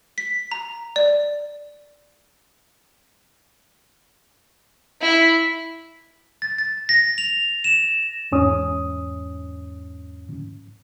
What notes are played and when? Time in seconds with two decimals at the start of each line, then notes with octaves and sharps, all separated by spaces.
0.18 B6
0.51 A#5
0.96 D5
5.02 E4
6.42 A6
6.58 A6
6.89 A#6
7.18 F7
7.64 E7
8.32 E2 G#2 C#4 D#6